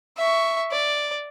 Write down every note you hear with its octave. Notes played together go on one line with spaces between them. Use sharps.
E5 C#6
D5